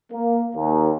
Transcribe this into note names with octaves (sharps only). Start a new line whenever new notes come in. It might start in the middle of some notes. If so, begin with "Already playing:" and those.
A#3
D#2